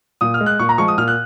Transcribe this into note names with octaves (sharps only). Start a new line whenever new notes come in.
A#2 D#6
F6
G#3
F#6
A#2 C#6
A#5
F3 G#3 C#6
D#6
A#2 F6
F#6